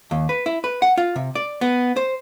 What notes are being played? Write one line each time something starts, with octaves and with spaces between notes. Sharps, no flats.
D#2
B4
E4
B4
F#5
F4
C3
D5
B3
C5